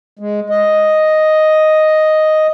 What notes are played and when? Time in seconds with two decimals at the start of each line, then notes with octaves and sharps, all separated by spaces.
0.19 G#3
0.50 D#5